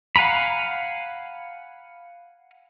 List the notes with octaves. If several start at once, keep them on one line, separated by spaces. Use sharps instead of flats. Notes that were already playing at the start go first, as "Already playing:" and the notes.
F5 F#5 G#5 A#5 B5